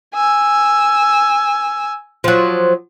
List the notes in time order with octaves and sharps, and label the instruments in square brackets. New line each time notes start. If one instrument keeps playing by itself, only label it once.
[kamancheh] G#5 E6
[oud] F3 F#3